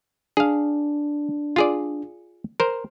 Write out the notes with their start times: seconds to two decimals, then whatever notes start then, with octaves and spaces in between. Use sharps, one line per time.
0.37 D4 G#4 F5
1.56 F4 G#4 D5
2.60 A#4 C5